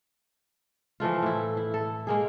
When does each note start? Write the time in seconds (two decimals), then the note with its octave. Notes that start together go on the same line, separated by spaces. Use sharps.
1.00 E3 F3 A3 F4
1.22 A2 E4
1.57 E4
1.74 A4
2.07 G#3 A#3 G#4